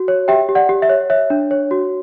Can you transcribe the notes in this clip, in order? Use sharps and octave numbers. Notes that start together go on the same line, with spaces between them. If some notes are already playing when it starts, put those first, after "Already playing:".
Already playing: F#4
C#5
G4 E5 G5
G4
D5 F#5
G4
E5
C#5
C#5 E5
D4
C#5
F#4